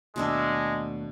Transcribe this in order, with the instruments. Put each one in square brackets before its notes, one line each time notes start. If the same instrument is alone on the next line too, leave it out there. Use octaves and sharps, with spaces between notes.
[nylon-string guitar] D#2 A3 A5 [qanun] B2 D4 E5 [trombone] G#3